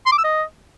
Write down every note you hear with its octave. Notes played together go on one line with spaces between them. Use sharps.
C6
D6
E6
D#5